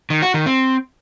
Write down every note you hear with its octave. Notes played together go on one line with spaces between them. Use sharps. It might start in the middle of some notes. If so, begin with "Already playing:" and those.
D#3
F#4
D#3
C4